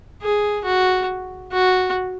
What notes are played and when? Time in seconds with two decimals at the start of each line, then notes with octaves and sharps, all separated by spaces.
0.22 G#4
0.65 F#4
1.53 F#4